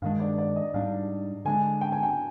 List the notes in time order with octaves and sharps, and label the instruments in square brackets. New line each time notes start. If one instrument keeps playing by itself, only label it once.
[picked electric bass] G2 D#3 G#3 D4 [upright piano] F5
[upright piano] D5
D5
D#5
[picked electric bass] G#2 G3 D4 [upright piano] F5
[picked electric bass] D3 G#3 D4 [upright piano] G#5
[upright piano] G5
G#5
G5